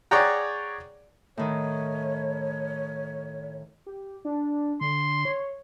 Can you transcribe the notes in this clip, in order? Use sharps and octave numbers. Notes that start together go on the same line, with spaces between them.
G#4 C#5 D5 F#5 G5 A#5
A2 D#3 C#5
G4
D4
D3 C6
C#5